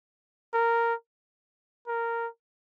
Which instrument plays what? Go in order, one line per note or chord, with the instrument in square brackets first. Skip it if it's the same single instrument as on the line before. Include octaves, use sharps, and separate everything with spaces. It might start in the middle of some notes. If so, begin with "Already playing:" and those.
[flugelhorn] A#4
A#4